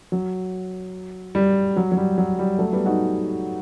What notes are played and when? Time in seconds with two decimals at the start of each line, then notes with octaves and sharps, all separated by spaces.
0.12 F#3
1.35 G3
1.76 F#3
1.92 F#3
1.97 G3
2.18 F#3
2.39 G3
2.58 F#3 A3
2.72 G3 B3
2.86 D#4 F#4